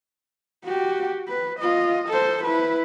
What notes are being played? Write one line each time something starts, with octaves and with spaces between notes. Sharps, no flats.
F#4 G4
B4
F4 D#5
A4 C5
E4 B4